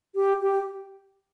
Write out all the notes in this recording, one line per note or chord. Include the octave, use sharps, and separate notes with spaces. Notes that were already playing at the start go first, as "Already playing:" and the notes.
G4
G4